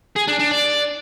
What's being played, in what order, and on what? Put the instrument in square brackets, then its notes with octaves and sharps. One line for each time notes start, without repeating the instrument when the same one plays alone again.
[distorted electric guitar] G#4
D4
D4
D5